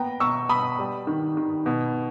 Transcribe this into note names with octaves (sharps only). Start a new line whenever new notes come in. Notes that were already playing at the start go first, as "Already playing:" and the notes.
Already playing: A#3 B3 G5 A#5
B2 C#6 E6
B2 B5 D#6
G3
D#3
D#3
B2